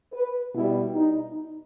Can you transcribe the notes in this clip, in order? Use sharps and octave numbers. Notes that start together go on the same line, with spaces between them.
B4
B2 G3 E4
D#4